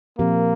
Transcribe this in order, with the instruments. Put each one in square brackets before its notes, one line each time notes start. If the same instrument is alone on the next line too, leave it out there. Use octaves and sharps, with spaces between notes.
[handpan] A#2 F3 C4 G4 A#4 [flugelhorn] A#3